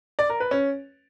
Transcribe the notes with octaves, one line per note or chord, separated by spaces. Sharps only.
D5
A#4
B4
C#4